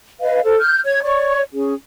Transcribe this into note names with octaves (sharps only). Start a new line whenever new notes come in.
B4 D#5 F5
A4 C5
F6 G6
C#5 G#6
C#5 D5 C#6
C#4 G#4